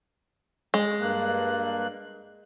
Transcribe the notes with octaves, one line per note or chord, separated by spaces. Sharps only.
G#3
G2 A#3 F#6